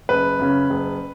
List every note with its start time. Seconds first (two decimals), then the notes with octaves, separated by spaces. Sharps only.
0.09 F#1 B4
0.39 F#2 C#3
0.70 F#1